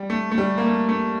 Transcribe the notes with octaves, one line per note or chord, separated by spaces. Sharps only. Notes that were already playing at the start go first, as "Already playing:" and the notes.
Already playing: G3
A3
A3
G3
A#3
A3
A3